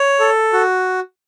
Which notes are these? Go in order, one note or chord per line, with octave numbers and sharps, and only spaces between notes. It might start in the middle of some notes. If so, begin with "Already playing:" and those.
Already playing: C#5
A4
F#4